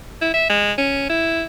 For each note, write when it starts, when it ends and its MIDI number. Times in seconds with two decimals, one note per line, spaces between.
0.21 0.32 64
0.34 0.46 76
0.49 0.72 56
0.78 1.06 61
1.10 1.44 64